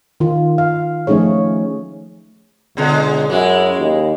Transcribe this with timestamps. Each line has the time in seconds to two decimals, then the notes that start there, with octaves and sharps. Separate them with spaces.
0.20 D#3 F4
0.58 F5
1.07 F3 A3 C#4 D#4 G#4 C#5
2.77 C#2 B2 D3 G#3
3.30 F#2 G#3 E4
3.78 D#2